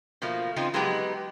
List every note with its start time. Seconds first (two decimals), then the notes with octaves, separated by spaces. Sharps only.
0.22 B2 F3 A3 A#3
0.56 C#3 F3 C4 D#4 F4
0.74 F#3 G#3 B3 D#4 G4 B4